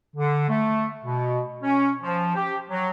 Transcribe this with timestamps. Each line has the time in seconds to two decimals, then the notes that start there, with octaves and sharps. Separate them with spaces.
0.16 D3
0.48 A3
1.04 B2
1.62 C#4
2.02 F3
2.35 G4
2.69 F#3